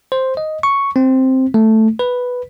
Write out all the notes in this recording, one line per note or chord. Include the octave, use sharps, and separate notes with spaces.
C5
D#5
C#6
C4
A3
B4